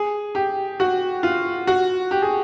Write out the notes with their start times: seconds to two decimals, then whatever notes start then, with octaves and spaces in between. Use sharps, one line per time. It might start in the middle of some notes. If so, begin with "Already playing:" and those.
Already playing: G#4
0.35 G4
0.80 F#4
1.23 F4
1.67 F#4
2.11 G4
2.22 G#4